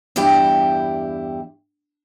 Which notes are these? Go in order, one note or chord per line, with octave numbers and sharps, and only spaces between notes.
E2 G2 E4 G4 G5